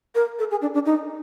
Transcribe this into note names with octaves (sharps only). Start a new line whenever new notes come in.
A#4
A4
G#4
D4
D4
D#4